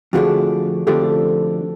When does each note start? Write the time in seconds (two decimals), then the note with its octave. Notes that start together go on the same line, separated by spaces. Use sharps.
0.13 F2 D3 F3 A3 D4 F#4 G#4
0.86 F2 D3 F3 A3 D4 G4 A4